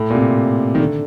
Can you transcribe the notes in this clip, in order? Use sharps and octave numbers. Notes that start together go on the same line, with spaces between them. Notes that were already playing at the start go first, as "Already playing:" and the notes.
Already playing: A2
A#2
C3
D#3
D3